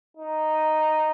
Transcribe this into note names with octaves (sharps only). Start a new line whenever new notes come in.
D#4